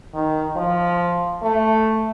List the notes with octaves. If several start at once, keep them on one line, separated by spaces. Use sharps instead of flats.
D#3
F3
A3